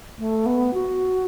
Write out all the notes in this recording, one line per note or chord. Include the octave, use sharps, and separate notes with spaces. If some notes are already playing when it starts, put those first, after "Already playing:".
A3
B3
F#4